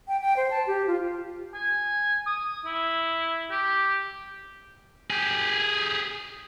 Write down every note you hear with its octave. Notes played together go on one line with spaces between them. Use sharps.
G5
G5
C5
A5
G4
F4
G#5
D#6
E4
G4
G4 G#4